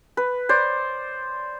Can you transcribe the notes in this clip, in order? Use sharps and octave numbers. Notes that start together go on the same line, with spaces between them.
B4
C5 D5